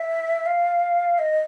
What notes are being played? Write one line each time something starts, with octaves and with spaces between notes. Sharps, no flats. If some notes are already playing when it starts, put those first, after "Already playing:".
Already playing: E5
F5
D#5